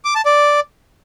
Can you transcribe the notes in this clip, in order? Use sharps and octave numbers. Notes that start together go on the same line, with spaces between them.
D6
A5
D5